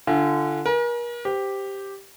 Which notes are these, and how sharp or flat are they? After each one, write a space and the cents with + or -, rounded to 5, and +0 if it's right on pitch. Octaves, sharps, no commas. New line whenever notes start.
D3 +0 F4 -35 G#5 +0
A#4 +40 G#5 +20
G4 +0 C5 -20